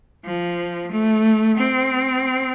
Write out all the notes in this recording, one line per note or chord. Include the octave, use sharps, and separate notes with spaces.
F3
A3
C4